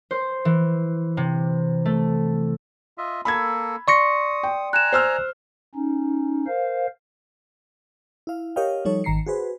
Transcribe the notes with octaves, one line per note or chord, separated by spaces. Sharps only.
C5
E3
C3
A3
F4 D#5 E5
A#3 A4 B5 E6 G#6
D5 C6 C#6 D#6 A#6 C#7
G5
G#5 A#5 F#6 E7
C5 E6 F6
C#4 D#4
A#4 C5 F5
E4 F5
G4 A#4 C#5 D#5 F5 G5
F3 G3 D#4 A4 C#5
G#1 D#3 A#5 C7 C#7
F#4 G#4 B4 C5